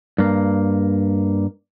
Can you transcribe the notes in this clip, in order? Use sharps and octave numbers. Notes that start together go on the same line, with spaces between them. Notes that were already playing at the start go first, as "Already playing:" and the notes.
G2 A#3